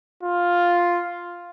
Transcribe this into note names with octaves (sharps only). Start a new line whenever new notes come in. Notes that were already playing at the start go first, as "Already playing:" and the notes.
F4